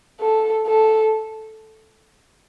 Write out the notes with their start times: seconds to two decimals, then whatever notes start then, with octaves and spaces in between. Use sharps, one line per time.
0.21 A4
0.67 A4